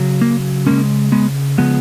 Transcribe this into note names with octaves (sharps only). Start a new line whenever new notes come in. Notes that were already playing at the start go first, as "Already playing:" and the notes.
Already playing: C#3 F#3
A#3
C#3 G#3 A#3 C#4
G#3 B3
C#3 F3 G#3 B3